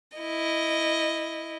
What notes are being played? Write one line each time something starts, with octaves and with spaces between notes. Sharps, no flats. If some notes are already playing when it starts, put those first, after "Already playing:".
E4 D#5